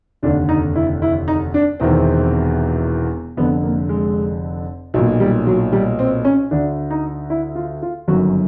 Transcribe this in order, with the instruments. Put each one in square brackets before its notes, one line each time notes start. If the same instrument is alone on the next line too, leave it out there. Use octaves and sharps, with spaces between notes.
[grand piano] F1 D#2 D3 D4
D#4
E4
E4
D#4
D4
E1 E2 C3 D#3 C4
F1 F2 D3 B3
A#3
G#3
B1 F#3
A#2
G3
F#3
G3
C4
C#4
D2 D3 D4
D#4
E4
F4
F4
G1 F#2 D#3 F#4